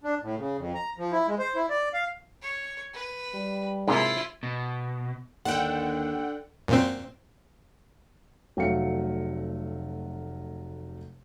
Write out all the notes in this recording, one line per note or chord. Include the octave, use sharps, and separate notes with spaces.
D4
A2
C#3
F2
A#5
F3
E4
G#3
C5
E4
D5
F5
C#5
B4
G3
G#2 C3 A#3 E4 F4
B2
D#2 D3 F#5 G5
F#2 A#2 C4
F1 F#3 A3 F5 C#7